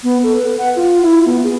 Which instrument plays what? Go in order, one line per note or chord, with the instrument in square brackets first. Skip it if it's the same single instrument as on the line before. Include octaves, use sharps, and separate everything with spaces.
[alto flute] B3
A4
B4
F#5
F4
E4
B3
G#4